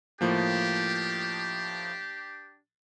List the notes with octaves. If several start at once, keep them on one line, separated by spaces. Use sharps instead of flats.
A2 F3 A#3 D4 G4